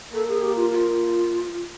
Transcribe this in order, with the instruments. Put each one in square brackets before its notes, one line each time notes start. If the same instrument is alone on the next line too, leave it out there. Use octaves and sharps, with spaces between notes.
[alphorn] A#3 [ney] A4
[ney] G#4
G4
F4
F4